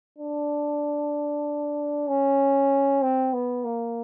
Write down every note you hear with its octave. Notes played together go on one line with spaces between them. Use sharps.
D4
C#4
C4
B3
A#3